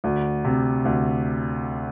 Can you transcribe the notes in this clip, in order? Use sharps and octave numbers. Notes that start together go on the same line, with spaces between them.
D2
C3
D2